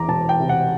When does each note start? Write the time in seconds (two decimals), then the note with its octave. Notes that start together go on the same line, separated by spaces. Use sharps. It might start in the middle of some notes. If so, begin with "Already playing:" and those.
Already playing: E2 E3 A#5 D6
0.08 E1 A5
0.29 G5
0.40 C3
0.49 F#5